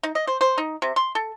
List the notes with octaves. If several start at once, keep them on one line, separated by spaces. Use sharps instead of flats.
D#4
D#5
C5
C5
D#4
C3
C6
A4